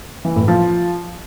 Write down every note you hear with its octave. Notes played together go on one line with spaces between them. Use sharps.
E3
A2
F3